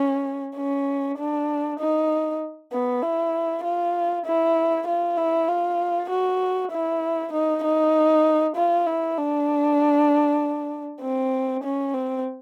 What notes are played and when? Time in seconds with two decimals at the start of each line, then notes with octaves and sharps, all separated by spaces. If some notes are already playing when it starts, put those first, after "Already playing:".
Already playing: C#4
0.57 C#4
1.18 D4
1.80 D#4
2.73 B3
3.03 E4
3.64 F4
4.26 E4
4.88 F4
5.17 E4
5.48 F4
6.10 F#4
6.72 E4
7.33 D#4
7.64 D#4
8.56 F4
8.86 E4
9.17 D4
11.02 C4
11.63 C#4
11.94 C4